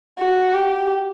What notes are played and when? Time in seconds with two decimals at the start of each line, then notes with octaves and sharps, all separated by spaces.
0.19 F#4
0.54 G4